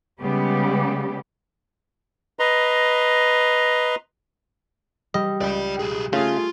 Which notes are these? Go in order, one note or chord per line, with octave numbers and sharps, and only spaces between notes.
C#3 G3 G#3 B3 G4
B4 D#5 A#5 C6
G3 D#5
C#2 D5 G5
B1 G#4
C#3 A3 F4 G#4